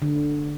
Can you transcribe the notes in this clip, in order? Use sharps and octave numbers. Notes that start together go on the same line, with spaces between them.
D3